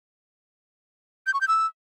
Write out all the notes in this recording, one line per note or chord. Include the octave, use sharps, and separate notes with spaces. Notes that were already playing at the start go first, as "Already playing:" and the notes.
G6
C#6
G6
E6